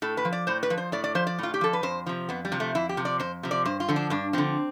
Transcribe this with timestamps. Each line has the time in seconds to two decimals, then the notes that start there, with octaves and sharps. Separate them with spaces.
0.02 A2 A4
0.17 B4
0.25 F3
0.32 D5
0.47 A2 C5
0.63 B4
0.70 F3
0.78 C5
0.92 A2 D5
1.04 D5
1.15 F3 C5
1.27 D5
1.38 A2 F4
1.54 G4
1.61 F3 A4
1.73 B4
1.83 F2 C5
2.06 C3 F3
2.29 F2 B3
2.45 G3
2.52 C3 F3
2.60 A3
2.75 F2 E4
2.89 G4
2.97 C3 F3
3.05 D5
3.20 F2 C5
3.43 C3 F3
3.51 D5
3.65 G2 C5
3.80 F4
3.88 D3 F3
3.96 D4
4.10 G2 D4
4.33 D3 F3 C4